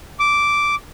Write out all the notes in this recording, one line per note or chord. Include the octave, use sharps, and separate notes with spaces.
D6